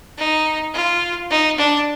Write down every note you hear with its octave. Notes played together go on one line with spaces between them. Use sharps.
D#4
F4
D#4
D4